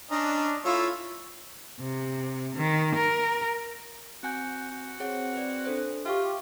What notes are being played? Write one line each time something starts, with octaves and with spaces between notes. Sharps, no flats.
C#4 D4 D#5 A#5
A3 E4 F4 C#5
C3
D#3
A#4
C4 F#4 G#5 G6
F#4
C4 G#4 C#5 F#5
B4 D5
D4 A4 C5
F4 G4 E5 F5 C#6